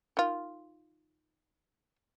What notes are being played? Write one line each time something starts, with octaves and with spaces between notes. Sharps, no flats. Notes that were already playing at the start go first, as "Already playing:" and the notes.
D#3 F4